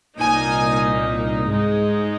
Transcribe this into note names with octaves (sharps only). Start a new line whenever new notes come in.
C2 A#2 A#3 D#4 G#5
G#2 G#3 D#4